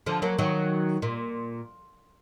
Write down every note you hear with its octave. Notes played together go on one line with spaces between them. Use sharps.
D3 F3
F#3 A#3
D#3 F#3
A#2